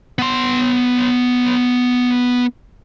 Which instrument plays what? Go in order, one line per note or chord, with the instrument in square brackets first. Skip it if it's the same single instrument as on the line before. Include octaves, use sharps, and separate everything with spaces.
[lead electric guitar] B3 C6